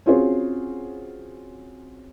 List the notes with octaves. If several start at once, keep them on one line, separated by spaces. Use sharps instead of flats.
C4 C#4 F4 F#4 G#4 C#5